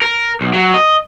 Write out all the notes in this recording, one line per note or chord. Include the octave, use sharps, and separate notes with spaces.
A#4
B1
F#3
D#5